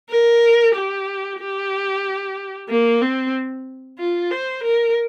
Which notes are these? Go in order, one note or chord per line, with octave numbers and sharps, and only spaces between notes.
A#4
G4
G4
A#3
C4
F4
C5
A#4